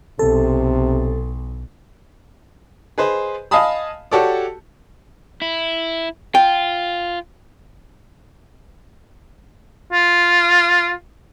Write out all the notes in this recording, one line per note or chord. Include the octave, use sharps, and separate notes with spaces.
B1 C3 A4
G#4 B4 C5 D#5
D#5 F5 G#5 A5 B5 D#6
F#4 G4 A4 C#5 D5
E4
F4 G5
F4